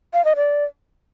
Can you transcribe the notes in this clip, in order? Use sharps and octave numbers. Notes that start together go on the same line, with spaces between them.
F5
D#5
D5